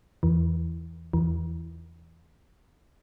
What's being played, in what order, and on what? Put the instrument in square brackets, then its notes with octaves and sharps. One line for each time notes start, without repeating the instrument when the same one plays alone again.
[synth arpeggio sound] E2 E3
E2 E3